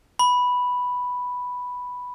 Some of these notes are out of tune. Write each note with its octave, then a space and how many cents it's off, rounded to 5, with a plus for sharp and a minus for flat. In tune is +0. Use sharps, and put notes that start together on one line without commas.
B5 +0